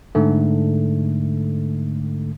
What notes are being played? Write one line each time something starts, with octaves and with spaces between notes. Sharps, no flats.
G#2 D3 A3